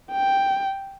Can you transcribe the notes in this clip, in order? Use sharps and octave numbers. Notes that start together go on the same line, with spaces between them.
G5